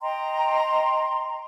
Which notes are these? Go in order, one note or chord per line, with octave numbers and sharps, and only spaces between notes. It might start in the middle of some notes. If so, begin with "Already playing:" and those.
D#5 G5 A#5 C6